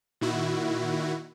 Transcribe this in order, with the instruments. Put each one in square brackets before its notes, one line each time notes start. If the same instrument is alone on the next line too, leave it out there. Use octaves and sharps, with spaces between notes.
[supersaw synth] A#2 D#3 E4 F#4